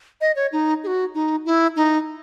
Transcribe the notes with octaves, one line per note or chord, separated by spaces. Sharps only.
D#5
C#5
D#4
G#4
F#4
D#4
E4
D#4